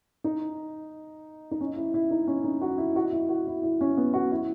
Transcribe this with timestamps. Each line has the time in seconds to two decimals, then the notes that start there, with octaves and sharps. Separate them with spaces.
0.24 D#4
1.51 D#4
1.61 C#4
1.76 E4
1.94 E4
2.11 D#4
2.27 C#4
2.44 D#4
2.61 F#4
2.78 E4
2.96 F#4
3.12 E4
3.29 F#4
3.47 E4
3.63 E4
3.81 C#4
3.97 B3
4.14 F#4
4.31 E4